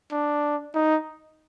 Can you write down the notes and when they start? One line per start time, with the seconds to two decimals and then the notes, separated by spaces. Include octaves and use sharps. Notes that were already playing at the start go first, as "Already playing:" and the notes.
0.12 D4
0.75 D#4